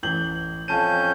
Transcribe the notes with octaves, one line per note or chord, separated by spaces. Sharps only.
A1 G6 F#7
F2 C#4 F5 A5 G6 D#7